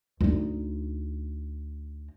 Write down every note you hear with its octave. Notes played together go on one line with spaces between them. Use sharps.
D2 D#4